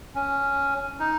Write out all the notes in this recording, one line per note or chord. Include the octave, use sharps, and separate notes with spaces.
C#4
D#4